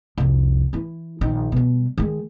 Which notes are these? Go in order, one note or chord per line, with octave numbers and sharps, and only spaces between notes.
C2 F2
E3 E4
A#1 D#3
B2 G3
D#3 G#3